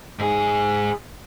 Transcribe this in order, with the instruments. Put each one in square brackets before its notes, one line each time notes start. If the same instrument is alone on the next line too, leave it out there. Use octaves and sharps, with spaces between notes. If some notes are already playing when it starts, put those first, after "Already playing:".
[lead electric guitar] G#2 G#4